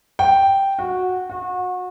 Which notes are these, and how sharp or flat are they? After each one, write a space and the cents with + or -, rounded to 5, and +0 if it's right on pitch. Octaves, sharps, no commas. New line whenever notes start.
G5 -5
F#4 -10
F#4 -30